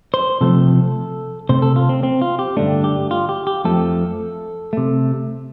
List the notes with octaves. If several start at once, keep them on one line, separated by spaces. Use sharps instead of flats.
C5
C3 F3 A3 A4
C3 A3 C5
A4
F4
C4
C4
F4
G4
G2 D3 A3 D4
G4
F4
G4
G4
F2 F3 A3 A4
C3 A3